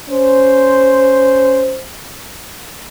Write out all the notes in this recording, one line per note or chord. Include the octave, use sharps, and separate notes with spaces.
C#4 C5